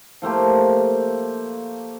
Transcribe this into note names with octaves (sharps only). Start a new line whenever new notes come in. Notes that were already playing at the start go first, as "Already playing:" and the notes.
F3 A3 A#3 G4